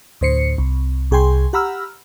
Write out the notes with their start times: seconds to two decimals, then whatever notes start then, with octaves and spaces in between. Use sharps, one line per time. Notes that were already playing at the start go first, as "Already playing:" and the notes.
0.21 D2 A2 C5 C7 C#7
0.58 C2
1.11 C2 G#4 G5 G#5 C6
1.53 G4 F#5 A#5 B5 E6 F6